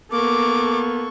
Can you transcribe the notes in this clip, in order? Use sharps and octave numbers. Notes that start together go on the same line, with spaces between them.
A#3 B3 A4 C#6 D6